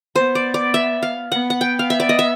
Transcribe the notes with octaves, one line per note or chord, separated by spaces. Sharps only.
B3 C5
D5
D5
E5
F5
B3 F#5
F#5
G5
F5
E5
D5
D#5
E5